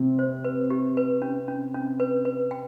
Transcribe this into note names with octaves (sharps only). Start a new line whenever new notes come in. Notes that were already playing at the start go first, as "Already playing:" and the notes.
Already playing: C3 C4
C5
B4
G4
B4
C#4
C#4
C#4
B4
B4
G5